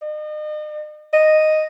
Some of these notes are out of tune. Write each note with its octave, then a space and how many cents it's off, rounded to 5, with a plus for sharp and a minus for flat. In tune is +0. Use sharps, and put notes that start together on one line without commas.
D#5 -40
D#5 -5